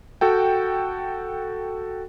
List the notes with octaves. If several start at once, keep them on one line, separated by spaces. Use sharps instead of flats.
F#4 A4 G5